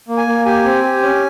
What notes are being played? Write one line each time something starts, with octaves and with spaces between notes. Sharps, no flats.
A#3
G#5
A#3
G4 G#5
C4
G4
C#4